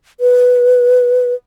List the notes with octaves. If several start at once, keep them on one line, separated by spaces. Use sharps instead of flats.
B4